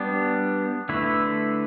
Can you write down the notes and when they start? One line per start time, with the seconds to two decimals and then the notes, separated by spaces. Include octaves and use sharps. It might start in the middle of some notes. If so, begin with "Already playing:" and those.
Already playing: G3 B3 D4
0.89 D3 A3 E4 B4